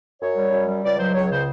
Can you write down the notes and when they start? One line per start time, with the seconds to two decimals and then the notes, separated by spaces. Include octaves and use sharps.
0.21 F#2 C#5
0.36 G3
0.51 F#2
0.67 G3
0.83 C#2 D5
0.98 F#3 C5
1.14 C#2 C#5
1.30 C#3 C5